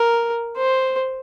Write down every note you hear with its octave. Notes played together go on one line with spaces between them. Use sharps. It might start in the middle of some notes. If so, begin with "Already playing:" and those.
Already playing: A#4
C5